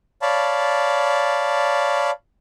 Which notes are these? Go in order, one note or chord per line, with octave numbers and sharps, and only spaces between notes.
C#5 D5 F5 A5 B5